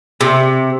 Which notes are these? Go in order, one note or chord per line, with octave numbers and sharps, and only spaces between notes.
C3